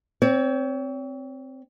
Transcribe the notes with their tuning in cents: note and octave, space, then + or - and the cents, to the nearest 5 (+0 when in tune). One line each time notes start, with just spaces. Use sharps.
C4 +0 C#5 +35